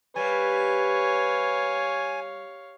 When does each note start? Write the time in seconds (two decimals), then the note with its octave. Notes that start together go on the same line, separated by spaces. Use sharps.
0.16 G3 B4 C#5 F5 G#5